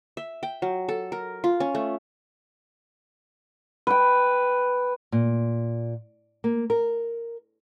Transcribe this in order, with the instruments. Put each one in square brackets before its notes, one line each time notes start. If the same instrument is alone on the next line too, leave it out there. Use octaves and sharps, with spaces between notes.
[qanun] E5
G5
F#3
A4
A#4
F4
C#4
A3
[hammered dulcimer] B4 G5
[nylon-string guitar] A#2
A#3
A#4